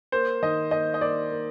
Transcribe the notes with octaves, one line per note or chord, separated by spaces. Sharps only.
A#3 C5
D#3 D#5
A#3 D#5
D#5
A#3 D5
A#3